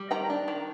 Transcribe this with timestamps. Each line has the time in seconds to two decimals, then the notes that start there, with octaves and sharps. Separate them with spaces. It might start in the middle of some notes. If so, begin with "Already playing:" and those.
Already playing: G3
0.11 D#3 G5 A#5
0.30 D4
0.48 D#3